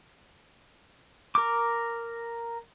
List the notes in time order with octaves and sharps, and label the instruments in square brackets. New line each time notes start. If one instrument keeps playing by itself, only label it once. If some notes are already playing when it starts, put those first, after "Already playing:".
[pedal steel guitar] A#4 D6